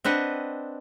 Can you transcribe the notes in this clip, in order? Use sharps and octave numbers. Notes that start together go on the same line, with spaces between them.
C4 D4 B4 D#5 F#5